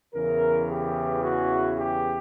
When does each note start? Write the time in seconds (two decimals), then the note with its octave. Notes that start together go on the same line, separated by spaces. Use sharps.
0.14 E2 C#3 E3 A#4
0.69 G4
1.23 F#4
1.78 G4